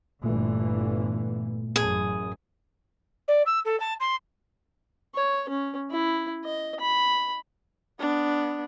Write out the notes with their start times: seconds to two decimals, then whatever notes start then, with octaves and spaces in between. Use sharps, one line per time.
0.24 G1 A#2 D3 E3 A3
1.76 A1 F#2 G#4
3.28 D5
3.46 E6
3.65 A4
3.80 A5
4.00 C6
5.15 C#5
5.49 C#4
5.91 E4
6.44 D#5
6.80 B5
8.00 B3 D4